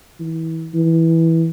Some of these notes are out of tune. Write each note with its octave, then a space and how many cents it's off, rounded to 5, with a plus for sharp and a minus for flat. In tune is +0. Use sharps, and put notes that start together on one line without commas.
E3 -25
E3 -10